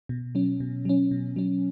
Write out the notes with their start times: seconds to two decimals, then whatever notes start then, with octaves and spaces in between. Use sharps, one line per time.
0.09 B2
0.35 F#3 C#4
0.60 B2
0.85 F#3 C#4
1.11 B2
1.36 F#3 C#4